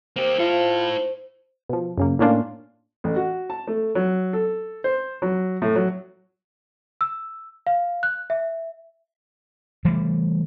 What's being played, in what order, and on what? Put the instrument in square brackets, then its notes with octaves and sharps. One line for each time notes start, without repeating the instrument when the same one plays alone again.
[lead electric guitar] A#3 G4 [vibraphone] C5
[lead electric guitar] E4 A4 [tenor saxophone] F4
[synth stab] B2 F3
F#2 C#3 A#3
A2 A#3 C#4 D4 F4
[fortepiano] A1
F#4
A5
A3
F#3
A4
C5
F#3
A2
F#3
[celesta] E6
F5
F#6
E5
[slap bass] E3 G3 A3